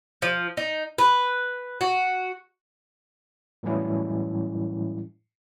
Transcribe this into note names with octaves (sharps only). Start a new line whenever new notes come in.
F3
D#4
B4
F#4
A2 E3 F#3 G3 C#4 E4